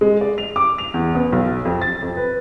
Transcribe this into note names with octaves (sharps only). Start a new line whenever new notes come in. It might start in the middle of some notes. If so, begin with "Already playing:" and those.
G#3
D5
F7
D6
F7
E2
B3
B1
F2
A6
F2
B4